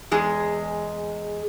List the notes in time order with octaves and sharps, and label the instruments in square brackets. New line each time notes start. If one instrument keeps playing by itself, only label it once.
[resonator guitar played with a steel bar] E2 G#3 G#4